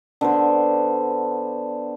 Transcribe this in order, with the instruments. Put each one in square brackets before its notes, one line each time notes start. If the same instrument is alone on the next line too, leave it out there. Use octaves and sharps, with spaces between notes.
[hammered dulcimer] D3 B3 C5